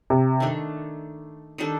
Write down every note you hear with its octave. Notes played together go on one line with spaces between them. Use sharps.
C3
D#3 A3 D4
D#3 G3 D4 A4